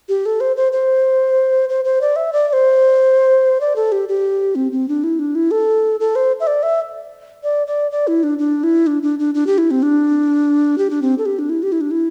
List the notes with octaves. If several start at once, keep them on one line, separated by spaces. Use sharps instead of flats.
G4
A4
C5
C5
C5
C5
C5
D5
E5
D5
D5
C5
D5
A4
G4
G4
C4
C4
D4
E4
D4
E4
A4
A4
C5
E5
D5
E5
D5
D5
D5
E4
D4
D4
E4
D4
D4
D4
D4
G4
E4
C4
D4
G4
D4
C4
A4
G4
D4
E4
G4
E4
D4
E4